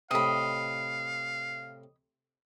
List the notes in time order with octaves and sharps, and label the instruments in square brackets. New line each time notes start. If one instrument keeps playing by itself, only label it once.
[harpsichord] A2 C3 [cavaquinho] D#5 B5 [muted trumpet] F5